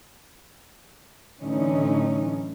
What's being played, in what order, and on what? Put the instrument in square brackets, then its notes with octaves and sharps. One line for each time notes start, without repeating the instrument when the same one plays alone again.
[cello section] A2 D3 E3 F#3 C#4 D#4